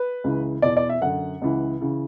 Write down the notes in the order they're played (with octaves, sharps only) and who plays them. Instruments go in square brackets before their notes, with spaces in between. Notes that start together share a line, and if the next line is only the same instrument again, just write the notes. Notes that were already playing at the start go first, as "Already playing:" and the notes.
Already playing: [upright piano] B4
C#2 C#3 E3
E2 B2 D5
D5
E5
F#2 D3 F#5
C#2 C#3 E3
C#3 E3